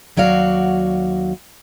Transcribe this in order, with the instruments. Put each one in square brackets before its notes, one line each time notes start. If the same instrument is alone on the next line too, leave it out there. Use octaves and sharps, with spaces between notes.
[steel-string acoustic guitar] D#2 F#3 F#4 D5 F5